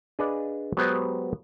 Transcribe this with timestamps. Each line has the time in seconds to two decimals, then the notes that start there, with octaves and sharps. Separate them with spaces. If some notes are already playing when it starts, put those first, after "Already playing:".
0.19 D4 G#4 B4 D5 D#5 F5
0.77 F#3 G#3 B3 F#4 G4 C5